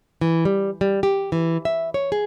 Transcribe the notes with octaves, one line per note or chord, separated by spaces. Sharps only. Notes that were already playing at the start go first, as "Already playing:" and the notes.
E3
G3
G3
G4
E3
E5
C#5
G#4